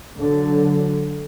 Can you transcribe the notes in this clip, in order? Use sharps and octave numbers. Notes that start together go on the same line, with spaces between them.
D3 F#3